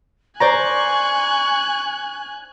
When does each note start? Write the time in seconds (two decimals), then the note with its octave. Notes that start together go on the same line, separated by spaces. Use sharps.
0.40 C5 D5 G#5 A#5 C#6 F#6